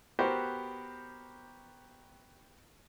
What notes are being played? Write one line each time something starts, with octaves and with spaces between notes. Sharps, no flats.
B3 F#4 G4 A#4 C5